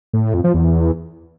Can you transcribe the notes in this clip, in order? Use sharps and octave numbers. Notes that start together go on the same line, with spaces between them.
A2
A2
F2
F3
E2